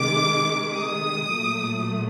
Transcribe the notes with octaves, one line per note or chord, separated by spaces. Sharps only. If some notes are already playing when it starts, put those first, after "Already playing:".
Already playing: C3 D#3 G#3 D6
D#6
A#2 F#3 A3